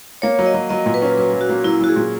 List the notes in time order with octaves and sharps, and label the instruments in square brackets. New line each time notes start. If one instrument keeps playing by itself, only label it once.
[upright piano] A#3 [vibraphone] C#5
[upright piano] F#3
[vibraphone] D#5
[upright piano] F#3
[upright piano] F#3 [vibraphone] D#5
[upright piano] A#2
[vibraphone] B4
[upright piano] C#4
[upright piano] F#3 [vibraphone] B4
[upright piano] F#3
[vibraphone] F#4
[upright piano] A#3
[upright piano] F#3 [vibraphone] E4
[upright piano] F#3 [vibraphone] F#4
[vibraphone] G#4
[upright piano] A#2